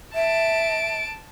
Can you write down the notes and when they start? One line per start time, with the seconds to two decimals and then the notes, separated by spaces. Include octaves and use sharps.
0.15 E5 A5 D7